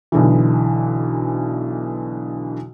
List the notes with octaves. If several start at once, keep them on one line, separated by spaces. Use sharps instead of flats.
B1 B2 D3 E3